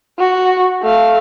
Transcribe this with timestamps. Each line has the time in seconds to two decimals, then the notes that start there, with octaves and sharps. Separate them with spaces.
0.19 F#4
0.83 A3 F5